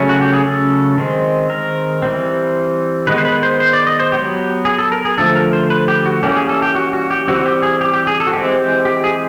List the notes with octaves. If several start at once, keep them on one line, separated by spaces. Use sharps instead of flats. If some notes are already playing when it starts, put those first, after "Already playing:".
Already playing: C#3 F#3 A3 C#4
F#4
G4
G#4
A4
D#3 G#3 C4
A#4
E3 G3 C4
D#3 G#3 B3 B4
C5
B4
C5
C5
D5
D#5
C5
F#3 B3 G4
G#4
A4
A#4
G#4
D3 F3 A3 A4
A#4
C5
B4
G4
F#4
E3 G3 A#3 C#4 G4
G#4
A4
G4
F#4
F#4
G4
E3 G3 C4 F#4
G4
G#4
G4
G4
G#4
A4
F#4
E3 G#3 C4 G4
G4
G4
G#4